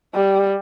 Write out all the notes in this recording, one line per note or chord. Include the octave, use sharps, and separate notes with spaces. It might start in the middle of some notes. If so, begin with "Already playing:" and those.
G3